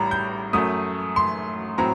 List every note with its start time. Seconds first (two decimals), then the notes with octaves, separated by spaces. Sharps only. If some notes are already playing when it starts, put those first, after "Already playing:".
Already playing: A1 A2 G3 A#5
0.11 G6
0.53 F#2 F#3 A3 D#6
1.16 C6
1.78 A2 F#3 C4 A#5